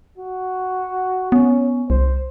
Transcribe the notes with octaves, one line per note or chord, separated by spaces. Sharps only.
F#4
B3 C#4
C2 C5